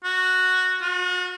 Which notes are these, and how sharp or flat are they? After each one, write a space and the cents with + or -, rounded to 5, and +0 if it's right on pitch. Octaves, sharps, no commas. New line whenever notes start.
F#4 -5
F#4 -40